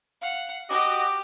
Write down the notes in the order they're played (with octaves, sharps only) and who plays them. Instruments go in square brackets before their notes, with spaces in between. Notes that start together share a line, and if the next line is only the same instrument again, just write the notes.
[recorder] F5 [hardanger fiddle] F#5
[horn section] F#4 D#5 [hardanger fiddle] G4 [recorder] D6